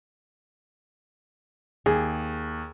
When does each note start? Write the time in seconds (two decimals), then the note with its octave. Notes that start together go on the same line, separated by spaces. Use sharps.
1.86 D#2 G#4